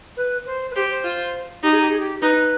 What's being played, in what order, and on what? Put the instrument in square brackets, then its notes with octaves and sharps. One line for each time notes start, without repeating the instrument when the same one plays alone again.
[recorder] B4
C5
B4
[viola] G4 [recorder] C5
[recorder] C5
[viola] F4
[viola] D#4 [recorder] G4
[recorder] G#4
G4
G#4
G4
[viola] D#4 [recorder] B4